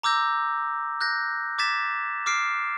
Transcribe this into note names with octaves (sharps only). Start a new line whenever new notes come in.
A#5 D6 E6 G6 A#6
F#6 G6 A#6
D6 G#6 A6 B6 E7
D6 F6 C7 D7